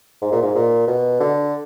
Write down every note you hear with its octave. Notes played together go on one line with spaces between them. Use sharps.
G#2
A#2
G#2
A#2
B2
D3